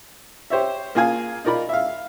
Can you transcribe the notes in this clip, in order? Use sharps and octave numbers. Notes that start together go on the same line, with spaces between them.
G4 C5 C#5 E5
A#3 F4 G#4 F5 G#5
D#4 F4 A#4 D5 B5
E5 F5